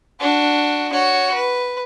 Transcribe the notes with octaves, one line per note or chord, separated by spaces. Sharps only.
D4 F#4
F#4 C#5
B4